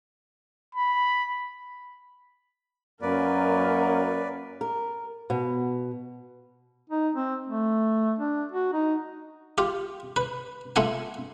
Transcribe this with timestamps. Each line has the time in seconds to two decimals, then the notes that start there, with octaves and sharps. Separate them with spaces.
0.75 B5
3.02 F#2 A#3 C#4 A#4 B4 D5
4.61 A#4
5.30 B2
6.90 D#4
7.15 C4
7.47 A3
8.19 D4
8.52 F#4
8.73 D#4
9.58 F4 G4
10.16 B4
10.76 A3 F4 F5 F#5 G#5